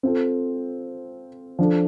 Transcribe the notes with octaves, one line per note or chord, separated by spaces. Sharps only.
C4 F4 A4
F3 D4 A4